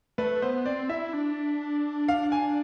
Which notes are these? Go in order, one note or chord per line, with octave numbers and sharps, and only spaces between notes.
A3 B4
B3 C5
C4 D5
E4 E5
D4
F5
G#5